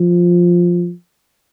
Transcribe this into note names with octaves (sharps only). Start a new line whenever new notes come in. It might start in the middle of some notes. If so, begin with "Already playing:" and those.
Already playing: F3